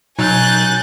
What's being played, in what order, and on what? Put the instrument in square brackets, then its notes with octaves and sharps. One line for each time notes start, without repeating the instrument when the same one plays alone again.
[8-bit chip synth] B2 F#3 D#4 [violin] G#5 F#6 [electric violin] G6 A6